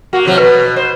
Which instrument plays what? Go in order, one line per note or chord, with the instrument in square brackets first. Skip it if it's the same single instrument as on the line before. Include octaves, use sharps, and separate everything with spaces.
[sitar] A#3 [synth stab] F#4
[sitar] C3 F3 F#3
[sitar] B2 [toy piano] B4
[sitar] C5